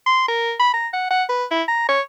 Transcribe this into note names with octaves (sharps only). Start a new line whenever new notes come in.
C6
A#4
B5
A#5
F#5
F#5
B4
E4
A#5
C#5